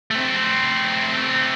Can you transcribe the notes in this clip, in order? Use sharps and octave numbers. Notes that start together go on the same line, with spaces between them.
A3 C4